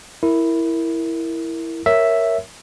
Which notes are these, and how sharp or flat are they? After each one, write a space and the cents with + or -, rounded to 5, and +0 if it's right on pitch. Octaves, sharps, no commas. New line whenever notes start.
E4 +0 A#4 -5
A#4 +0 C#5 +0 E5 +0